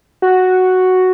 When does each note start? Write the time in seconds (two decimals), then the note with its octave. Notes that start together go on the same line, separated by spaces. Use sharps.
0.22 F#4